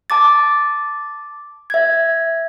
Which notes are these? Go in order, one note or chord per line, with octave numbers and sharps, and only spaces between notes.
A5 D6 A6
E5 G#6